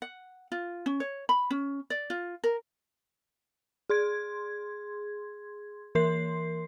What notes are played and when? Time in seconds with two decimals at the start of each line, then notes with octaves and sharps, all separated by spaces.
0.02 F#5
0.52 F4
0.86 C#4
1.00 C#5
1.29 B5
1.51 C#4
1.90 D5
2.10 F4
2.44 A#4
3.90 G#4 C6 G#6
5.95 E3 A#4 C6 C7